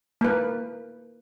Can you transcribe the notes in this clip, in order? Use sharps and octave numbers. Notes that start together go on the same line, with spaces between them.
A#3 B4